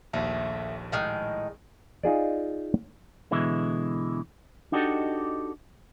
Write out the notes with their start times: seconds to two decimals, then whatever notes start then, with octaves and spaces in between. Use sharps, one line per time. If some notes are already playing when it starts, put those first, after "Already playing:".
0.13 A#1 D#2 A3
0.92 A2 D#3 G#3
2.03 D#4 F4 G#4 D5
3.31 B2 D3 E3 G#3 E4
4.72 D4 D#4 F#4 G4 A4 D#5